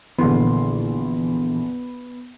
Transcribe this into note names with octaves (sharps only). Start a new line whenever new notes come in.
A#1 A#2 D3 E3 B3 C6